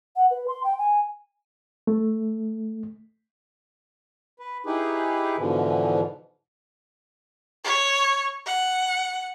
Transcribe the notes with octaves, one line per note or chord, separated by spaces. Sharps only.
F#5
B4
C6
G5
G#5
A3
B4
D#4 E4 G4 G#4 B4
G#2 B2 D3 E3 F3
C#5
F#5